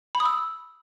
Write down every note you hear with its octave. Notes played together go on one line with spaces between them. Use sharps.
B5
D#6
E6